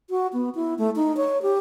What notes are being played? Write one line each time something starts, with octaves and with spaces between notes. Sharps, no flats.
F#4
B3
E4
A3
D#4
C#5
G4